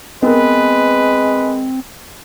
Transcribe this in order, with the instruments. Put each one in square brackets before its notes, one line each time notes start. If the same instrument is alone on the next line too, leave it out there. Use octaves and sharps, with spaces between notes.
[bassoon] G#3 [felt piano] B3 A#4 [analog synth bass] C4 [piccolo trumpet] B4